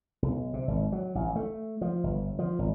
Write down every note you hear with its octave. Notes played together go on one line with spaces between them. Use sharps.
B1
C3
G#1
F#3
A1
A3
F3
G1
F3
G#1